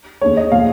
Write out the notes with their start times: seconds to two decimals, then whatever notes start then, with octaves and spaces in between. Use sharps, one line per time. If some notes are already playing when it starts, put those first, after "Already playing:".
0.21 D#2 D#3 G#3 C#5
0.37 D#5
0.52 A#2 F3 G#3 F5